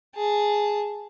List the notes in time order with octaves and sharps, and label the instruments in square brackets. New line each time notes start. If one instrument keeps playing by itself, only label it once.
[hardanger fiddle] G#4 A5